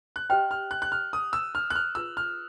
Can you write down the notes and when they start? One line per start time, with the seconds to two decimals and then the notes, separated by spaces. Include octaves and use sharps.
0.16 F#6
0.30 G4 C5 D#5 G5 F6
0.51 F6
0.71 F#6
0.82 F#6
0.92 F6
1.13 D#6
1.33 E6
1.55 F6
1.70 F#6
1.75 F6
1.95 F4 G#4 B4 E6
2.17 F6